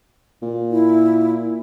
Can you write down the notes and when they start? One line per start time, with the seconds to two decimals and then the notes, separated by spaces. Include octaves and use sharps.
0.42 A#2
0.71 E4